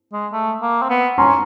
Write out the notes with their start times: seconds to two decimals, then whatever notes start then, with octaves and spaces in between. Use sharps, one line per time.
0.12 G#3
0.32 A3
0.62 A#3
0.82 C4
0.90 B3
1.18 C#4 A#5 C6